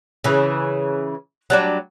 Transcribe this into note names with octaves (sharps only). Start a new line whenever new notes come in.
C#3 E3
F#3 G3 D4